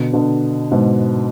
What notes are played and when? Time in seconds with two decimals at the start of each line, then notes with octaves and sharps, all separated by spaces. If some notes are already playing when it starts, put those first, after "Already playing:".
Already playing: B2 D3
0.13 B2 D3
0.72 G#2 B2